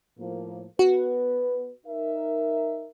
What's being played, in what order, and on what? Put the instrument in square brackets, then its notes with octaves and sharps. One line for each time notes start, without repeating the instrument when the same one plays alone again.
[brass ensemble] A2 F3 A#3
[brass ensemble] B3 B4 [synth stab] F#4
[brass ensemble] D#4 A#4 E5